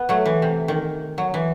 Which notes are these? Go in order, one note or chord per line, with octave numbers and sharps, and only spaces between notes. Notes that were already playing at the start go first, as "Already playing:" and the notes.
Already playing: B3
F#3 A3
E3
C3
D#3
F#3
E3